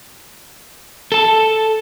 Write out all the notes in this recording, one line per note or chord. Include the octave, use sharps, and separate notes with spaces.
A4 A5